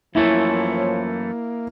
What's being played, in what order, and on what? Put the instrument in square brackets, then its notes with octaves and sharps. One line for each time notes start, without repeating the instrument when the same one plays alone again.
[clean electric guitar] F#2 E3 A3 [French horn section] F3 C#5 [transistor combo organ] A#3 [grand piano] E4